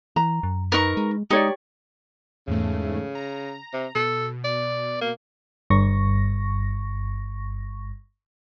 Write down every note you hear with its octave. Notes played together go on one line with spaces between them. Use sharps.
E3 A#5
F#2
D#4 A#4 B4 C#6
G#3
G#3 D#4 G4 C#5 D5
E2 G#2 C#3 A3
A#5
C3
B2 A4
D5
A#3
G1 G2 C#6 A#6